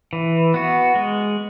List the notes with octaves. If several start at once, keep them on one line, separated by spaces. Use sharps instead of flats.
E3
B3 F#4
G#3